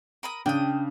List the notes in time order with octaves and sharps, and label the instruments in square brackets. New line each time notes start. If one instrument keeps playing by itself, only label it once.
[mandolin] A#4 B5 D#6
[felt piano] C#3 [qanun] D4 [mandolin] G5 D#6